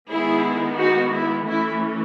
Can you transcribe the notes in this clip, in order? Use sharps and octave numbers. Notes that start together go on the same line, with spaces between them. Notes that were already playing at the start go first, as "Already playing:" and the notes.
D#3 G#3 B3 E4 G#4
D#4 F#4
E4
E3 A3 C#4 E4